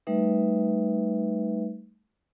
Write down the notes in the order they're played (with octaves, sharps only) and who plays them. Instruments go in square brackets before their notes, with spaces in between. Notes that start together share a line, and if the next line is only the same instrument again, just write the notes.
[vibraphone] G3 A3 D#4 B4 E5